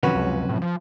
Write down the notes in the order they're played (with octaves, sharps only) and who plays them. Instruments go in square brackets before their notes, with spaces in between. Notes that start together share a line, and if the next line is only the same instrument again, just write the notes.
[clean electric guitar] F#2 C3 F3 [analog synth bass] D#3 [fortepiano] C#4 F#4 B4
[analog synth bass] C#2
A2
F3